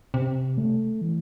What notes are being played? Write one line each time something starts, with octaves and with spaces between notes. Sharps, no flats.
C3
A3
E3